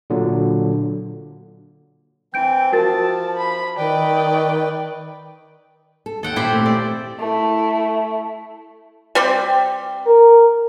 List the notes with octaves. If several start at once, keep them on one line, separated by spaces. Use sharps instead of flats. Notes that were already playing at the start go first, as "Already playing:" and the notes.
A#2 D3 F#3
E3 C4 G6 D7
F3 F#4 A#4 A5 A6
B5
D#3 B4 D5 G5
A4
D#2 A4 F#5 G5
A#2 E4 G4 C5
A3 C4
D5
A3 E4
G3 C4 G4
A#4